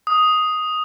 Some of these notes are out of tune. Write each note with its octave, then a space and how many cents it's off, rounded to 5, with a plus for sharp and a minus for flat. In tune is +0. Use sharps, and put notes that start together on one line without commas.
D#6 +0